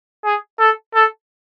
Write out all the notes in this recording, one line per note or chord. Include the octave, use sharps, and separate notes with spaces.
G#4
A4
A4